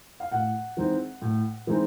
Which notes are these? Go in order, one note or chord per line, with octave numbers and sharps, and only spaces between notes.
F5
A2 F#5
E3 G#3 C4 D#4
A2
E3 G#3 C4 D#4